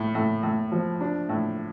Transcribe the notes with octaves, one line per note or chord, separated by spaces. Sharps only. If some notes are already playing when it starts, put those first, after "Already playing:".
Already playing: A2
A2
A2
F3
D4
A2